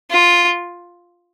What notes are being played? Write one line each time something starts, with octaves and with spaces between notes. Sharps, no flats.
F4